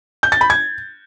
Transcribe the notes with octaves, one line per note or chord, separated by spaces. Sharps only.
G6
A6
B5
G#6